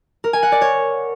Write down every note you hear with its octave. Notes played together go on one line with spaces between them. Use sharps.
A#4
G#5
F#5
D5
C#5